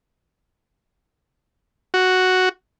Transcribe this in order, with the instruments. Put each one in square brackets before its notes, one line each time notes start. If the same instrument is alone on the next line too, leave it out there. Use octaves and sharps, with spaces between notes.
[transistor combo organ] F#4